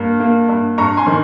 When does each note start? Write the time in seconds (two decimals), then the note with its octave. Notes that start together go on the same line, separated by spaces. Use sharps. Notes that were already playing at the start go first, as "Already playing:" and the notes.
Already playing: G2 A#3
0.20 A#3
0.49 G2
0.78 G2 A#5 C#6
0.97 G#5 C6
1.07 D#3